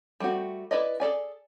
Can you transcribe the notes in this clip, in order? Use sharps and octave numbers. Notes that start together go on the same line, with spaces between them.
G3 A3 C4 F#4
E4 B4 D5 D#5
G#4 A4 D5 G#5